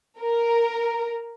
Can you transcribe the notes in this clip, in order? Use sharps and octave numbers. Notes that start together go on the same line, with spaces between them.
A#4